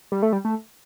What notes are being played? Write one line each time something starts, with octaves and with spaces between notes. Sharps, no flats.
G3
A3
G3
A3